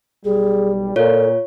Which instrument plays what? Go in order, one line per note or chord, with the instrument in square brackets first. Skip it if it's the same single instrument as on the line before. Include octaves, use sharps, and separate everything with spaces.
[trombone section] B1 G3 [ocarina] G#4
[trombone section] A#2 [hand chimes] F4 C#5 [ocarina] A4